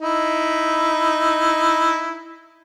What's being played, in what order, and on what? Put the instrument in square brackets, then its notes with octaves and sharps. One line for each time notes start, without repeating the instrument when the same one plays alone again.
[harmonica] D#4 E4